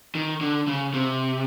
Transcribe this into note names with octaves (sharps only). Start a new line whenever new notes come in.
D#3
D3
C#3
C3